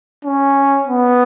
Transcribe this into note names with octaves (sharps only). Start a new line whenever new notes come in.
C#4
B3